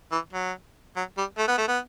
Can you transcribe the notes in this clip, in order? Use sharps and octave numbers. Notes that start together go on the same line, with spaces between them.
E3
F#3
F#3
G3
A3
B3
A3
B3